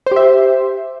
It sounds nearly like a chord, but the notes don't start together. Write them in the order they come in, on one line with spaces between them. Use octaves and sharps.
C5 G4 E5